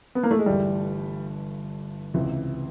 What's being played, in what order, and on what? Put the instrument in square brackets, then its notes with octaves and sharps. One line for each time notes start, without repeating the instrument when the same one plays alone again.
[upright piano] B3
A#3
A3
G#3
[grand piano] G1 G2 E3 A3 [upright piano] G3
[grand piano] C#2 C3 E3